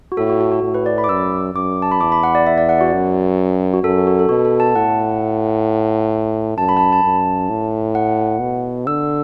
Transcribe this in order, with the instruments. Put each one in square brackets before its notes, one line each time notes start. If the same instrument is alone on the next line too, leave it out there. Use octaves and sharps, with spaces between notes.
[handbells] F#4
[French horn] A2 [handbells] A4
[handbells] F#4
F#4
F#4
[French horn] A2
[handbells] B4
D5
B5
D6
[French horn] F#2 [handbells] E6
[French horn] F#2 [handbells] D6
[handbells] A5
B5
[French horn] E2 [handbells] D6
[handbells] B5
F#5
D5
E5
D5
F#5
F#4
[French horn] F#2
[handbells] F#4
[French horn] F#2 [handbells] A4
[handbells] F#4
A4
[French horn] B2 [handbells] F#4
[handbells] A4
A5
[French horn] A2 [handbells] F#5
[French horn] F#2 [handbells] A5
[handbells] B5
A5
B5
A5
[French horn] F#2
A2
[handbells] F#5
[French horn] B2
[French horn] D3 [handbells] E6